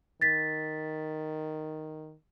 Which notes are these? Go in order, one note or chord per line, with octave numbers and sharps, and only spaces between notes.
D#3 A6 B6